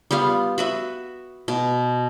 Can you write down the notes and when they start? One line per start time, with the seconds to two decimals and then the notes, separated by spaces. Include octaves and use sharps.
0.11 G3 B3 F4 F5
0.58 F#4 B4 E5
1.48 B2